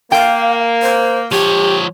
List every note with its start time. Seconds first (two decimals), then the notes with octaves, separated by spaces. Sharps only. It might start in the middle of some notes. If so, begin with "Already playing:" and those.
0.12 A#3 F5 G5
0.82 C5
1.32 F3 G4 C#5